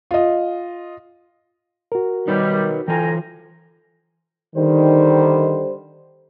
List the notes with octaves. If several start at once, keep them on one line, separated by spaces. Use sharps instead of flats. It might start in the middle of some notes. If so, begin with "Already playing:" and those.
F4 D#5
F#4 A#4
D#3 G3 D#4 B4 C#5
E3 F4 A4 G5 G#5 A#5
D3 D#3 G3 C5